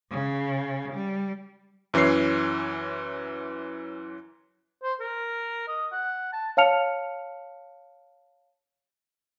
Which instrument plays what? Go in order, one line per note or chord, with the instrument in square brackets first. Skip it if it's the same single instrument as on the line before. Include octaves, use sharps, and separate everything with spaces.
[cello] C#3
G3
[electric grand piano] F#2 E3 C#4 C#5 C7
[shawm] C5
A#4
D#5
F#5
A5
[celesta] C#5 F5 A5 F6 C#7 F7